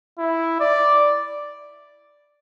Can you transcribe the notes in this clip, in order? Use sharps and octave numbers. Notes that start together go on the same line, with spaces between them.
E4
D5